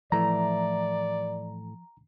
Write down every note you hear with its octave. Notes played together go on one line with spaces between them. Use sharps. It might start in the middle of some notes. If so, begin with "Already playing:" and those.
A2 E3 F3 A3 D5 A#5